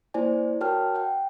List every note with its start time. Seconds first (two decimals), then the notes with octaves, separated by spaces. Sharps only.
0.14 A#3 E4 C5 D5 G#5
0.61 F#4 A#4 C#5 G5 A5 F6
0.95 F#5 G5